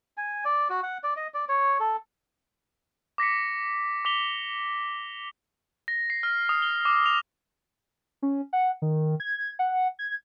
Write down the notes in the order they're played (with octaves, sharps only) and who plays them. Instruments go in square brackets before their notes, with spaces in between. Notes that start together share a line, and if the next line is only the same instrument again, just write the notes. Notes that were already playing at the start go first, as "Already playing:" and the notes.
[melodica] G#5
D5
F#4
F#5
D5
D#5
D5
C#5
A4
[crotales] D6 A#6 B6 C#7
D6 B6 F7 G7
A#6
C7
F6
D#6
G7
D6
F7
[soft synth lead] C#4
F#5
D#3
G#6
F#5
G#6